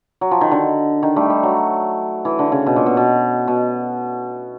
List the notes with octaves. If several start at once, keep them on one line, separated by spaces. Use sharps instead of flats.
F#3
F3
D#3
D3
D#3
G3 A3
G3
F#3
E3
D3
C#3
B2
A#2
B2
B2
B2